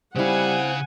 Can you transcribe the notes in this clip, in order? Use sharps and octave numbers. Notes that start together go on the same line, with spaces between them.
C#3 G3 C4 D#4 E4 F5 F#5 G#5